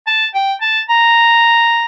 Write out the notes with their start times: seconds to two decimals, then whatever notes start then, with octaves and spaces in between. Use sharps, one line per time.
0.07 A5
0.34 G5
0.61 A5
0.89 A#5